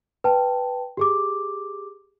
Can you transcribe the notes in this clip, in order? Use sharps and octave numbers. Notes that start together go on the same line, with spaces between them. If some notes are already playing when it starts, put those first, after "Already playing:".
B4 G5 A5
G4 G#4 D6